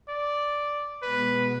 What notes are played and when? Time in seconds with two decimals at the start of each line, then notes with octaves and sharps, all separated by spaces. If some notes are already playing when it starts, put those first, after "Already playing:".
0.08 D5
1.02 B2 G#3 B3 B4